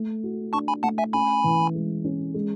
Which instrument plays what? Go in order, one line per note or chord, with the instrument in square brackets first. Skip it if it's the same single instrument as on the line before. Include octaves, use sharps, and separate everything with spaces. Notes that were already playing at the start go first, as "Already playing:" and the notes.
Already playing: [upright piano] A3
F#4
[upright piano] D4 [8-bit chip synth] A5 C#6
[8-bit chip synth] G#5 B5
[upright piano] A3 [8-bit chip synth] F#5 A5
[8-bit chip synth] E5 G#5
[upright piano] C#4 [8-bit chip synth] G#5 B5
[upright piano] E3
G#3
C#4
G#3